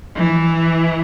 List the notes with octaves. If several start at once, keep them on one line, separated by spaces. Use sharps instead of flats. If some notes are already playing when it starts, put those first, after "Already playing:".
E3